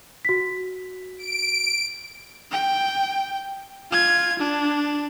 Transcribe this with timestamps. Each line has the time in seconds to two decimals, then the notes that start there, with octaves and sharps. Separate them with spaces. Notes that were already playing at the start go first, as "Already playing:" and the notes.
0.25 F#4 B6
1.18 D7
2.52 G5
3.91 F4 G#6
4.39 D4